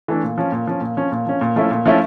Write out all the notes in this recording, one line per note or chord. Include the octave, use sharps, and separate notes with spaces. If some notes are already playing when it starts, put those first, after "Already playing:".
E3 A3 D4
A#2
F3 C#4
A#2
F3 C#4
A#2
F3 C#4
A#2
F3 C#4
A#2
F3 A3 C#4 E4
A#2
F3 A3 C#4 E4